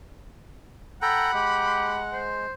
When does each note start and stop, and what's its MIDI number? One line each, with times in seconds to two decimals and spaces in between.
1.02 1.32 69
1.02 2.27 78
1.02 1.32 79
1.02 1.32 82
1.02 2.01 83
1.34 2.46 56
1.34 1.98 67
2.13 2.52 72